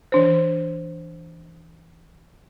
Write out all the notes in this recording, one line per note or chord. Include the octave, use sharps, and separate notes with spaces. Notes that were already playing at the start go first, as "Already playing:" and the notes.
E3 D4 C5